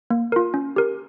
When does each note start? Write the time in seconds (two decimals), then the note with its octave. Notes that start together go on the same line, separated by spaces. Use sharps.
0.10 A#3
0.32 F4 A#4
0.54 C#4
0.76 G4 A#4